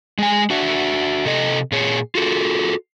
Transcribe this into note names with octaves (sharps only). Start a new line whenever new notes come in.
G#3 G#5
D4 F#4 E5
C3 A4 D#5
A#2 G#4 C#5
F4 F#4 A4